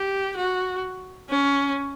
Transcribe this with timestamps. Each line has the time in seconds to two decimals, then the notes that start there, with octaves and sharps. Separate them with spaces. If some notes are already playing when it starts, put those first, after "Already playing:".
Already playing: G4
0.36 F#4
1.29 C#4